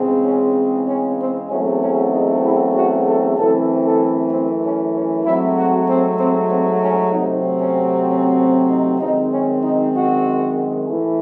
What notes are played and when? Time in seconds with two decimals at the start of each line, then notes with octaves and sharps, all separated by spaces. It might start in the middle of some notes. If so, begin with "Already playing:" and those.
Already playing: E2 C#3 G#3 C4
0.24 C#4
0.87 C#4
1.18 C4
1.50 E2 C#3 F#3 A3 C4 C#4
1.80 C#4
2.12 D#4
2.44 E4
2.75 F#4
3.06 A4
3.37 F#2 E3 A3 C4 A4
3.83 A4
4.31 C4
4.63 C#4
4.93 C#4
5.25 G#2 F#3 A3 C4 E4
5.56 F#4
5.87 C4
6.18 C4
6.49 C4
6.81 C#4
7.12 C3 F#3 A3 C4 D#4
7.59 C#4
8.06 C#4
8.38 C#4
8.69 D#4
9.00 F#2 D#3 G#3 C4 D#4
9.30 C#4
9.62 D#4
9.94 F#4
10.88 A2 E3 A3